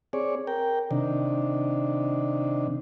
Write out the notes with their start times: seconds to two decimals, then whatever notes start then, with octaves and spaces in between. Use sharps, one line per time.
0.13 C4 G#4 C#5 D5
0.47 A#4 G5
0.91 C3 D#3 D4